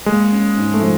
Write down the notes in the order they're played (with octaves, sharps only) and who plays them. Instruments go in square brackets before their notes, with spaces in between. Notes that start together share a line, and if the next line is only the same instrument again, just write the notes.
[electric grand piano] G#3 [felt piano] A#3
[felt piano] C#4
G#2
[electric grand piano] A3
[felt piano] F3